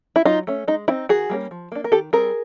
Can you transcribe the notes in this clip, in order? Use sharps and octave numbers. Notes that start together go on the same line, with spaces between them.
E4
F#3 D#4 F4
A3 C#4
G#3 D#4
C4 D#4 E4
D#3 F#4 G#4
G3 A#3 C#4
F3
A#3 D4
A#4
D#3 G4 A4
G3 C4 G#4 A#4